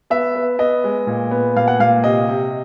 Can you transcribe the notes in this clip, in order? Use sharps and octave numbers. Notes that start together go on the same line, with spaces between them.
B3 E5
B3
B3 D#5
G#3
A#2
B3
A#2 F5
F#5
A#2 F5
C3 D#5
C3